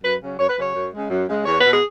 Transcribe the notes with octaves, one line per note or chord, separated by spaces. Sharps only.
F#2 B4
C#3 F#3 C#4
F#2 C#5
B4
C#3 F#3 C#4 C#5
F#2
C#3 G#3
F#2
C#3 G#3
E2 C#5
B4
B2 B3
G#4